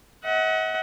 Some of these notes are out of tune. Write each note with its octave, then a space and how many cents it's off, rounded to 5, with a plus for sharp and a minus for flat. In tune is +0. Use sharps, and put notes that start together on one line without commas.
D#5 +45 F#5 +10